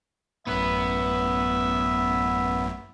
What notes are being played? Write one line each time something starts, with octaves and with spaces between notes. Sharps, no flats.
A1 F#2 A2 B3 B4 E5